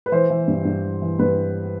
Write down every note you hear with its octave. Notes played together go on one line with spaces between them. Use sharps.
B4
E3 C5
E3
G2
G2
E3
E3
G2 B4